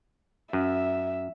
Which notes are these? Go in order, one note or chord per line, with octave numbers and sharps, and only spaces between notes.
F#2 E5